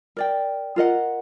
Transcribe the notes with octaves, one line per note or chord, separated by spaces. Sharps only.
A#4 D5 G5
F4 A#4 D#5 F#5